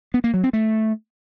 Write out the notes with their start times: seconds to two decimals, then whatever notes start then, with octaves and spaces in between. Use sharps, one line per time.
0.14 B3
0.24 A#3
0.34 F#3
0.44 C4
0.53 A3